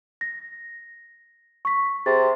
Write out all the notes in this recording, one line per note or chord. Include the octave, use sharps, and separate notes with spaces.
A#6
C#6 B6
C3 G#4 A6